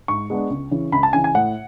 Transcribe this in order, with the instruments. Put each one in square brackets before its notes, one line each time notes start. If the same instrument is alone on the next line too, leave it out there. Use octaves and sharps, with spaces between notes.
[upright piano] G#2 C#6
G#3 B3 D4
C#2
C#3 E3
C#2 B5
A5
C#3 E3 G#5
G#5
A2 F#5